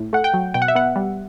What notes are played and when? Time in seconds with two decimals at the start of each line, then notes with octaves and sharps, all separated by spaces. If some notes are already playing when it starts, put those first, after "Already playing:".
Already playing: A2
0.13 A3 F#5
0.24 G5
0.34 F#3
0.54 B2 G5
0.62 F#5
0.68 E5
0.75 B3 F#5
0.96 G3